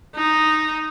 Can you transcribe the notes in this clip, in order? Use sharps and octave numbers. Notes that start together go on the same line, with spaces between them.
D#4